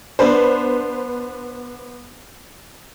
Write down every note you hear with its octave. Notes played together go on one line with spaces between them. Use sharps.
B3 D4 B4 C5